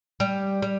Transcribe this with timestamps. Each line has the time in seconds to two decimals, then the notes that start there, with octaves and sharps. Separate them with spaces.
0.20 G3
0.62 G3